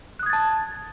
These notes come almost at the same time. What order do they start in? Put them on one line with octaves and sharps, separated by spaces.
F#6 D#6 G#6 A6 A5